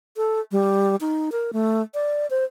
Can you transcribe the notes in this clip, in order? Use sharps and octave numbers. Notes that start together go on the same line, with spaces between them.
A4
G3
D#4
A#4
A3
D5
C5